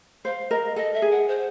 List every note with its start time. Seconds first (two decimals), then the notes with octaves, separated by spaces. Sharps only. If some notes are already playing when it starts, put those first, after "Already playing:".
0.25 C5 F5
0.50 A#4 D#5
0.76 A4 D#5
0.93 E5
1.02 G#4
1.10 F#5
1.28 C5